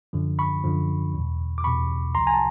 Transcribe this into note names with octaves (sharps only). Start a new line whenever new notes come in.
F#2 D3 F3
B5 C#6
F#2 D3 F3
E2 B2
D6
E2 B2 B5 C#6
C2 C3 F3 A#5 C6
G#5 A#5
A5